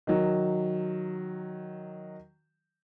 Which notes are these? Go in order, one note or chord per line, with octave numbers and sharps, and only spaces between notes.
D#3 F#3